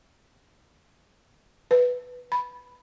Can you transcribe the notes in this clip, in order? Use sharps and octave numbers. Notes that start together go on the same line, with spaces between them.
B4
B5